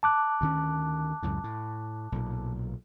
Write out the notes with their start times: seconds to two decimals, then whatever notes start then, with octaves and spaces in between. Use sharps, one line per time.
0.03 A5 D6 F#6
0.41 D2 D#3 C#4
1.23 C#2 F#2 A2
1.44 A2
2.12 B1 A#2